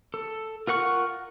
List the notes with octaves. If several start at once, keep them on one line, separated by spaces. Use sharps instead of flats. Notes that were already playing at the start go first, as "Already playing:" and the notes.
A4
F4 A#4 F#5 C#6 F6